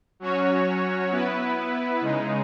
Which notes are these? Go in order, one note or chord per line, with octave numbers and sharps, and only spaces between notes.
F#3 C#4 F#4 C#5
B3 E4 B4
C#3 G#3 D#4